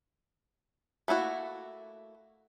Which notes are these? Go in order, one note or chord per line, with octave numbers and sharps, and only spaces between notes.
A3 A#3 E4 F#4